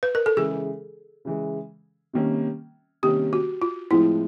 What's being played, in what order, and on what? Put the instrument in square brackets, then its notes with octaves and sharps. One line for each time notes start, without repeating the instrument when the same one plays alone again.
[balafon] B4
A#4
A4
[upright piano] C#3 E3 G#3 [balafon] G#4
[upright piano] C#3 E3 G#3
C3 D#3 G3 A#3 C#4
[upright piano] C3 D#3 G3 A#3 C#4 [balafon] G4
[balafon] F#4
F4
[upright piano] A2 F3 G#3 C4 [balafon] E4